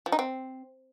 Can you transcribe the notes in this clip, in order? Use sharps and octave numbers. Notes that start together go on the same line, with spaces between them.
F3
D#4
C4